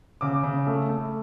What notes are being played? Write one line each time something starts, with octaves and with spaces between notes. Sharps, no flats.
C#3 D6
C#3
A3
A3